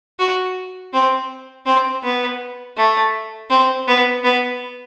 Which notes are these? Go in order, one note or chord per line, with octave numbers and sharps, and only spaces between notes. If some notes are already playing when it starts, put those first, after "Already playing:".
F#4
C4
C4
B3
A3
C4
B3
B3